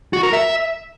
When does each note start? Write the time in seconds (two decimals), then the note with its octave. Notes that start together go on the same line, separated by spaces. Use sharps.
0.13 F#4
0.23 A#4
0.33 E5